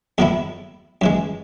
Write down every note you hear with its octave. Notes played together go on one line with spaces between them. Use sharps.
E2 B2 F#3 A3 E4
F#2 E3 G#3